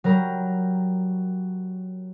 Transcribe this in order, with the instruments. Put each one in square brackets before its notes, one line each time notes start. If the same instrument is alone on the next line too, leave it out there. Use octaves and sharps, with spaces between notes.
[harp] F#3 G3 A#4